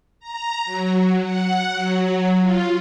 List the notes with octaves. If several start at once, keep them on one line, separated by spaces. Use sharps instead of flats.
A#5
F#3
F#5
F#3
F4